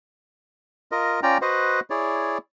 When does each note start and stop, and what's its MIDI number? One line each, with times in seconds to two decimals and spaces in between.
0.92 1.20 65
0.92 1.20 70
0.92 1.20 75
1.23 1.38 61
1.23 1.38 65
1.23 1.38 74
1.23 1.38 79
1.23 1.38 82
1.42 1.80 66
1.42 1.80 71
1.42 1.80 72
1.42 1.80 75
1.42 1.80 78
1.90 2.38 64
1.90 2.38 68
1.90 2.38 73
1.90 2.38 74